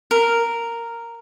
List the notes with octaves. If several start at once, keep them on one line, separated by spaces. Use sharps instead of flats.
A#4